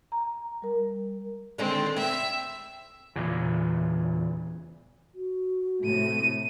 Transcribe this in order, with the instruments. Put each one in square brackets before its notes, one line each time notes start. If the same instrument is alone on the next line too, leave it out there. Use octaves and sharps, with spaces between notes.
[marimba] A#5
G3 A#4
[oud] D3 D#3 G#3 [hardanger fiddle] C4
[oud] C4 [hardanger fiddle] E5
[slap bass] E2 A#2 C#3
[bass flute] F#4
[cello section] A2 C3 [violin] D#7